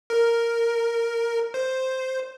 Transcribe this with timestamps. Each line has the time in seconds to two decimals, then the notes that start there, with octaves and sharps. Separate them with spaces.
0.10 A#4
1.54 C5